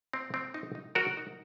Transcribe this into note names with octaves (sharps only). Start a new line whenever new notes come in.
C4
C4
D#4
D#4
F#3 F#4 A#4
D#4